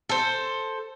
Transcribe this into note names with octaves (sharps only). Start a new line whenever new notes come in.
A4 C5